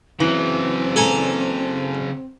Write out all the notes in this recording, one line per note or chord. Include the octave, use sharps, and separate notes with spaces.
C#3 E3 F#3 C4
A4 G#5 A#5